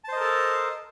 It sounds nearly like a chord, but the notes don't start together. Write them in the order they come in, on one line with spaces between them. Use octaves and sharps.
A5 C5 D#5 A#4 A4